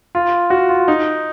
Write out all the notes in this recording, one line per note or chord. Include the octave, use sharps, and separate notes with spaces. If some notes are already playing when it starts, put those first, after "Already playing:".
F4
F#4
F4
D#4